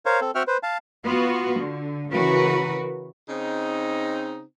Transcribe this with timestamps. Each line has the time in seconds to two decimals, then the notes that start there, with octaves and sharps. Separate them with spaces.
0.06 A#4 C5 C#5 F5
0.21 C4 A4
0.35 C4 F#4 E5 F#5 G5 F6
0.47 B4 C5
0.63 F5 A5
1.04 B3 F4 F#4
1.60 D3
2.11 C#3 E3 C#4 F#4 A#4 B4
3.29 C#3 C4 D#4